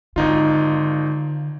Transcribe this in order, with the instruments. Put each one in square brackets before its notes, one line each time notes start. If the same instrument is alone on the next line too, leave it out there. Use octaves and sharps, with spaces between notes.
[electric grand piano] G#1 D#4 F4 [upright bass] D3